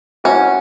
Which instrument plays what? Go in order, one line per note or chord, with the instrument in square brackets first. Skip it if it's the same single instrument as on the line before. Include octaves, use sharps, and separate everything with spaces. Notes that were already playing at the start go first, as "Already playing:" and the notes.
[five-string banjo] C#4 [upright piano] F#4